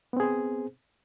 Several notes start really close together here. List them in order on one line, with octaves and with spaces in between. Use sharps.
B3 C4 G#4 C5